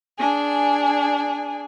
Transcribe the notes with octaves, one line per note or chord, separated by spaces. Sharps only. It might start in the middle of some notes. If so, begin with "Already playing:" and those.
D4 G#4 G#5